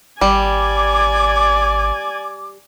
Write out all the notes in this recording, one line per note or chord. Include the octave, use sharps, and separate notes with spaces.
G#1 G3 D5 G#5 D6